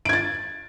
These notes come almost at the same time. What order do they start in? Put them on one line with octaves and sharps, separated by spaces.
D7 G#6 A6